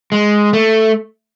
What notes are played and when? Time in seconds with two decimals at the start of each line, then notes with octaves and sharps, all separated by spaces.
0.12 G#3
0.53 A3